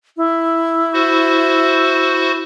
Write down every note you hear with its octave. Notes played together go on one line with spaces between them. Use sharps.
E4
F#4 C5